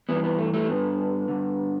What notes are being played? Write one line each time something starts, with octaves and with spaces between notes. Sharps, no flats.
G2 E3 B3
B3
A3
A3
G2 D3 B3
G2 D3